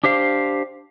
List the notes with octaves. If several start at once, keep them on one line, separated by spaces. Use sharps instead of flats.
D4 G4 C5 F5